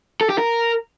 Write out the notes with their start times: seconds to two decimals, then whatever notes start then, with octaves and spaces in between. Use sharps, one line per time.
0.21 A4
0.29 G4
0.38 A#4